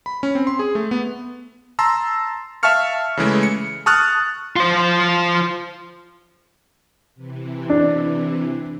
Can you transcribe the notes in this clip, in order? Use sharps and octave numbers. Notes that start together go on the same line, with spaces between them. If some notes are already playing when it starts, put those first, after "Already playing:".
B5
C#4
C4
C6
G#4
A3
B3
A5 A#5 C6 E6
E5 F5 A5 C#6 F6 C#7
C#3 E3 G#3 A3
C#7
A5 C#6 D#6 F6 F#6 A6
F4 C5
C3 E3
D4